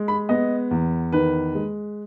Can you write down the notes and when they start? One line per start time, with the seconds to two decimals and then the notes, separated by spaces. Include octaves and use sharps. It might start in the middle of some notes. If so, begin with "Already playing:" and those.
Already playing: G#3
0.08 B5
0.29 B3 D#5
0.71 E2
1.12 D#3 B4
1.55 G#3